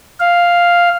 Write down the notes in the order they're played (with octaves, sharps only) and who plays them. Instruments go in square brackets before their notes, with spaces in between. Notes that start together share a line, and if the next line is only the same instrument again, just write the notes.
[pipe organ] F5